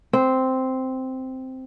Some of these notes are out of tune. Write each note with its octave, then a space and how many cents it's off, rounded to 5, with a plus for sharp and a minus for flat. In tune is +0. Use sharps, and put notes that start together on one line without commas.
C4 -5